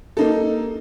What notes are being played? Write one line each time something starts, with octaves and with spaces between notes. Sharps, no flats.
A#3 D#4 A4